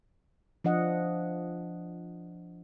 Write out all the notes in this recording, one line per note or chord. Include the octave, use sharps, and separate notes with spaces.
F3 D4 D#5 F#5